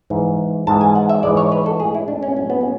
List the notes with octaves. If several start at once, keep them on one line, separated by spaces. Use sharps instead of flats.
G#2 E3 G#3
G#2 E3 G#3 A5
G#5
F#5
E5
G#2 E3 G#3 D5
C#5
B4
A4
A2 G#3 G#4
E4
D4
C#4
A2 F#3 C#4
B3
C#4